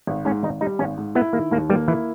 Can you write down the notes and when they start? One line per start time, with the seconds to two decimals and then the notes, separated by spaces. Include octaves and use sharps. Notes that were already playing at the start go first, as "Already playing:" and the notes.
0.07 G#1
0.25 G#2 C#4
0.43 G#1 D#4
0.61 G3 D#4
0.79 G#1 C#4
0.97 G#2
1.15 B3 E4
1.33 D#3 A#3
1.51 D#2 A#3
1.70 G3 A#3
1.88 E3 E4